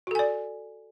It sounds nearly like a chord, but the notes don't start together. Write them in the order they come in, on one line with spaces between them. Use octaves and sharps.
F#4 A4 G#5 D5